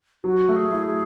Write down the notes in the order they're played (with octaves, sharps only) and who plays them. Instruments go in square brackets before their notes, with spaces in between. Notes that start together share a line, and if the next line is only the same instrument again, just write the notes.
[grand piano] F#3 [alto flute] F#4
[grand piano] A3
[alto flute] G#4
[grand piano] E4
[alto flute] G#4